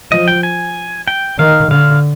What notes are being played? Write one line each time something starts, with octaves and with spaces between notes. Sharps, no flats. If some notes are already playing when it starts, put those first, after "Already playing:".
F3 D#5
G5
G#5
G5
D#3 F5
D3 F5